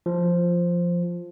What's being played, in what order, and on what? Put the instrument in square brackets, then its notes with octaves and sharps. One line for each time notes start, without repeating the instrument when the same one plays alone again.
[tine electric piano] F3